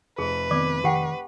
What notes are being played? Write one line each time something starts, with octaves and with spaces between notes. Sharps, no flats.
F1 G#4 B4
D#3 B3 C4 D5 D6
D#3 G4 F#5 G5